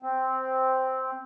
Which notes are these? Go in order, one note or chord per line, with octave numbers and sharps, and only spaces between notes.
C4